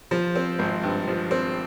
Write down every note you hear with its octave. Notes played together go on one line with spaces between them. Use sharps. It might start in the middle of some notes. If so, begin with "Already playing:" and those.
F3
C4
G#1
G2
F3
C4